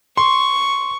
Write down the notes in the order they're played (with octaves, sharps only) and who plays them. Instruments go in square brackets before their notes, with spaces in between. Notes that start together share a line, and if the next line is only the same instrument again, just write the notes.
[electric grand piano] C6 [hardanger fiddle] C#6